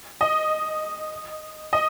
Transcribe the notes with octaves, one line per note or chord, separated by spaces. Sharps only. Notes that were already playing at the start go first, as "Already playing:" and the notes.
D#5
D#5